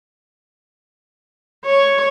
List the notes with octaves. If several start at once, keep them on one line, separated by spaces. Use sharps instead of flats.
C#5